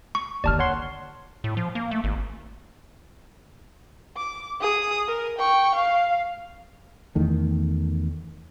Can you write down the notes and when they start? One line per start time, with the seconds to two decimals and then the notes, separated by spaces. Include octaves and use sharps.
0.15 C#6
0.44 D#2 D3 D#3 D5 A5 F6
0.59 C#5 F#5 C6
1.44 A2
1.57 F3
1.75 A#3
1.91 A3
2.04 G#1
4.17 D6
4.60 G#4 D#6
5.07 A#4
5.38 G5 C#6
5.75 F5
7.15 E2 D#3 A3